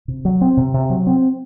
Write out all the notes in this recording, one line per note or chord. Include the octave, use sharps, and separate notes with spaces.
C3
F#3
C4
C3
C3
F#3
C4